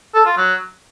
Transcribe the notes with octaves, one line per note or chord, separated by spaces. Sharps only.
A4
F4
F#3